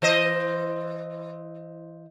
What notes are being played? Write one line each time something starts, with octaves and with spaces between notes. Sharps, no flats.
E3 C5 D#5